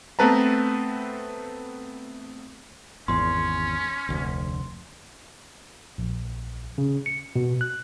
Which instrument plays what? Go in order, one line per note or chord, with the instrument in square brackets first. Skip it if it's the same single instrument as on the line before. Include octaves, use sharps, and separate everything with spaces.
[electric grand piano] A3 B3 C4 B4 A5 A#5
[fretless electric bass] G#1 E2 [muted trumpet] C#4 [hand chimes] C6
[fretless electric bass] F1 D2
[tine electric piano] A#1
C#3
C#7
B2
F#6